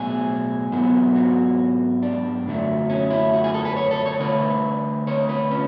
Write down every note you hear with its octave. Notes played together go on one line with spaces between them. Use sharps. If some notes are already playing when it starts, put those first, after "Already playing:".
Already playing: B1 A2 F#3 B3 G#4
G#2 F#3 B3
F#4
D4
F#2 D3 F#3 A3
C#4
E4
F#4
G#4
A4
B4
C#5
A4
C#5
D2 D3 A3 B4
C#5
B4
C#4